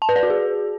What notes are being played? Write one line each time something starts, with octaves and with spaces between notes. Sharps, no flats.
A5
B4
D5
F#4
G#4